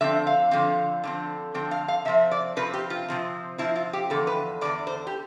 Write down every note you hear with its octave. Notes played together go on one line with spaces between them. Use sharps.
D3 F3 C4 E5
F5
D3 F3 C4
D3 F3 C4
D3 F3 C4 G5
F5
F5
C3 F3 C4 E5
D5
C3 F3 C4 B4
G4
F4
C3 F3 C4
C3 F3 C4 E4
F4
G4
E2 D3 F3 A4
B4
E2 D3 F3 D5
C5
G4